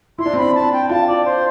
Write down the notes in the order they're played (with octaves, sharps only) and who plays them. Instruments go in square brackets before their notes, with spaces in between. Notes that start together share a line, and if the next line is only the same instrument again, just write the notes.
[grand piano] E4 [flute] C6
[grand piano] D4
C4
[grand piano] D4 [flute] B5
[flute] A5
G5
[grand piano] F4 [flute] A5
[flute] D5
C5